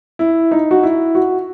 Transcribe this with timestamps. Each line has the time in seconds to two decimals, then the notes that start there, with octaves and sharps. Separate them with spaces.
0.19 E4
0.51 D#4
0.71 F#4
0.83 E4
1.15 F#4